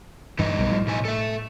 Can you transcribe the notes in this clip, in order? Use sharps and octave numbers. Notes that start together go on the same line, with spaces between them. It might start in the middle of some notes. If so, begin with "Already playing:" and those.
G2 E3 G3 D#4 E4
B1
A2 F3
B2 D#4 G#5
A4 E5